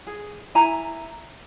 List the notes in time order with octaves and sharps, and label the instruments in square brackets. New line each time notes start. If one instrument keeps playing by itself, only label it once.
[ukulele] G#4
E4 G#5 A#5